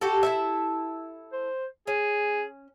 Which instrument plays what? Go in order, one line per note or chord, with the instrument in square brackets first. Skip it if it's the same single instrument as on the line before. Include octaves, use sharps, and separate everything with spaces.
[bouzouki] F#4 G4 A4
E4 A4 E5
[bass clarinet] C5
[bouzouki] C#4 [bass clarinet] G#4